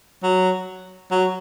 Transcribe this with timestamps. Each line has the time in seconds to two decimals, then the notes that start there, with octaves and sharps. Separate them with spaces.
0.23 F#3
1.11 F#3